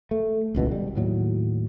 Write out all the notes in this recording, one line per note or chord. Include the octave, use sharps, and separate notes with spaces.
A3
D#1 C#2 B2 E3
G3
D#2 A2 F#3